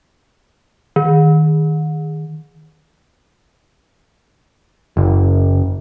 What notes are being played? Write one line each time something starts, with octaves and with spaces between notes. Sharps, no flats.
D#3
F#1